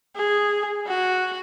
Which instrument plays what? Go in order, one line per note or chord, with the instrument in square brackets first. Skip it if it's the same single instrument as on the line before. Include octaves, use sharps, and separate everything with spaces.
[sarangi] G#4
F#4